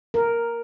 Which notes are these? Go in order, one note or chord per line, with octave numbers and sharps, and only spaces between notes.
A#4